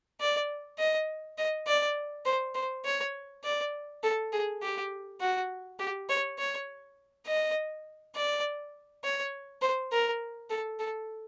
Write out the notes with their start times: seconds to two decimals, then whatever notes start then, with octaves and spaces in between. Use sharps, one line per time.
0.20 D5
0.79 D#5
1.38 D#5
1.67 D5
2.25 C5
2.55 C5
2.85 C#5
3.44 D5
4.03 A4
4.32 G#4
4.62 G4
5.21 F#4
5.79 G4
6.09 C#5
6.38 C#5
7.26 D#5
8.15 D5
9.04 C#5
9.62 C5
9.92 A#4
10.50 A4
10.79 A4